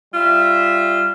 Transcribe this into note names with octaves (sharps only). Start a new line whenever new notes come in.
G3 F4 E5